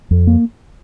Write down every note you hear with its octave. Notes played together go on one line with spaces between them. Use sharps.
F2
A#3